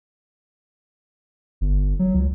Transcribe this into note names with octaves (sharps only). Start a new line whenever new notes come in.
G1
F#3
C#2